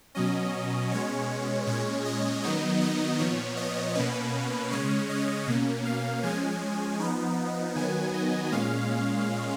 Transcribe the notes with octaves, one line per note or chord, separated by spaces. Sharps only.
B2 F#3 C#4 D#5
B2 G#3 C#4 C#5
A#2 G#3 C#4 C#5
D#5
D#3 F#3 B3 D#4 D#5
D#5
A#2 F3 B3 C#5
D#5
B2 A#3 C#4 B4
C#3 G#3 C#4 C#5
D#5
B2 A#3 C#4
F5
F3 G#3 C#4 G#5
F3 B3 D#4
D#3 F#3 B3 G#5
D#5
A#2 G#3 C#4 F5